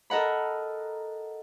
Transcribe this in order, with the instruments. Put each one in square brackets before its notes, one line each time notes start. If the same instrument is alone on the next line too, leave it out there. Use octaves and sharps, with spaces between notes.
[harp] A4 A#4 D#5 F#5 B5